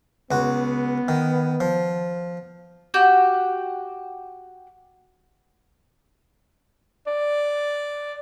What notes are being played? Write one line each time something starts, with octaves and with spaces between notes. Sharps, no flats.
C#2 B3 F#4
D#3
F3
F#4 G4 G6
D5